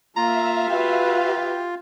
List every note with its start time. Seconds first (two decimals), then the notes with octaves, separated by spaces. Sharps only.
0.16 A#3 F4 E5 F5 A#5
0.70 F#4 G4 B4